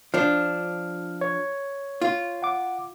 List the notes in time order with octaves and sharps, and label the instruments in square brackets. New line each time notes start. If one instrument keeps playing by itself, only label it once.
[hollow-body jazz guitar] F3 D4 [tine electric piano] F6
[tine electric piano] C#5
[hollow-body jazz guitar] F4
[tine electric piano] F#5 D6